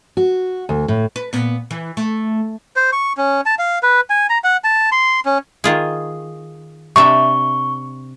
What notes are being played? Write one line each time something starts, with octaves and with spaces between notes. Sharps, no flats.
F#4
D2
A2
B4
A#2 B3
E3
A3
C5
C#6
C#4
A5
F5
B4
G#5
A#5
F#5
A5
C6
C#4
D#3 F4 G#4
C3 D4 E5 C#6